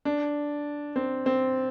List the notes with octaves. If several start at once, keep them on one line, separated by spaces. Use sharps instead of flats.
D4
C4
C4